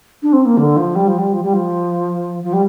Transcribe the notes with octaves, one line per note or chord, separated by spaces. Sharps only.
D4
C4
A#3
D3
F3
G3
F3
G3
F3
G3
F3
F3
G3